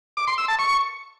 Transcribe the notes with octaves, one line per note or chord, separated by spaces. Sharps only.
D6
C6
E6
A5
C#6